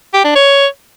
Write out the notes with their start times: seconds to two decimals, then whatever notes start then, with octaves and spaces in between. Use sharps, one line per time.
0.14 G4
0.24 D4
0.35 C#5